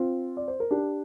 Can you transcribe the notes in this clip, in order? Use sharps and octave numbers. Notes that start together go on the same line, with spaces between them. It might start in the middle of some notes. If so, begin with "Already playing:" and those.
Already playing: C4 F4
D5
C5
A#4
D4 G4